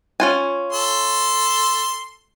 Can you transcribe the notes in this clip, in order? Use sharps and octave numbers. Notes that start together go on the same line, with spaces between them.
C#4 F4 G#5
A4 C6